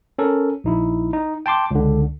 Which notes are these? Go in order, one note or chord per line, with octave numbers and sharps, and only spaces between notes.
C#4 A4 A#4
A#1 D#4 E4
D#4
G5 A5 C6 D6
C#2 D3